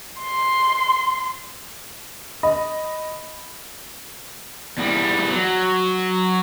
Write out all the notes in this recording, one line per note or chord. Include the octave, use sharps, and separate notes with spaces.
C6
D#5 B5
E2 G3
F#3